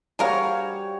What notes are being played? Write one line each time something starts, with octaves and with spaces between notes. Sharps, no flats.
G3 F#4 G#4 A#4 C#5 F5